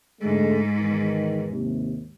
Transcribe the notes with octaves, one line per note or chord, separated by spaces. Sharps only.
G#2 D3 G#3 A3
E2 D#3
D#2 C3